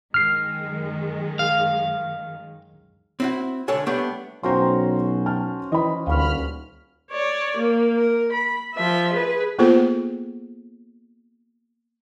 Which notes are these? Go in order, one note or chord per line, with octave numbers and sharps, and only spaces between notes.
F#2 D#3 G#3 F6 C7
F5
C4 E4 F#4
C#2 D3 A4 C#5 G#5
G3 A3 B3 D4 G4
B1 C#4 F#4 C5 G5 A#5 C6
A5 F6
E3 D#5 B5
D#1 D2 F5 B5 C#6 F6
C#5 D5
A#3
A#4
B5
F3 E5
G#4 B4
A#3 B3 F4 G#4 A4 C5